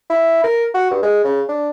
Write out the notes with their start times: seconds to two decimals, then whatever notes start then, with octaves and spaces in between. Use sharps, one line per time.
0.10 E4
0.44 A#4
0.74 F#4
0.91 G2
1.03 G#3
1.24 C#3
1.49 D4